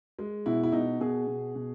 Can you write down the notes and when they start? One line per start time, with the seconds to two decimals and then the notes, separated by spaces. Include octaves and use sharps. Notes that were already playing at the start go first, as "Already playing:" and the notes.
0.19 G#3
0.46 B2 E4
0.63 E4
0.72 B2 D#4
1.00 B2 G#4
1.27 B2
1.55 B2